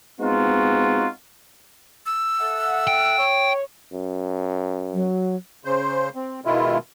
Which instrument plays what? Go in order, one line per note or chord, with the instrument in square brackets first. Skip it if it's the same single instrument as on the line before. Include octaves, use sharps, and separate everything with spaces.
[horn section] G#3 B3 C4 D#4 F4 F#4
[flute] E6
[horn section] A4 E5 F#5
[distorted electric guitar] G5
[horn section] C#5
[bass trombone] F#2
[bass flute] F#3
[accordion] C#3 C5
C4
B2 D#3 G#3 E4 F4